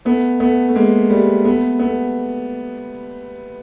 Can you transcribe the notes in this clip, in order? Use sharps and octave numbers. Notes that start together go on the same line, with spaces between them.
A3 B3
A3 B3
A3
G#3 A#3
G3 A3
A3 B3
A3 B3